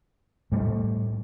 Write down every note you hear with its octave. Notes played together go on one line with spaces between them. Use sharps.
A2 G3 A3